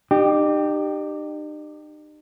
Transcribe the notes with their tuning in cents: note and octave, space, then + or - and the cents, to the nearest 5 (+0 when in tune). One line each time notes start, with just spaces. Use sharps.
D#4 -45 G4 +0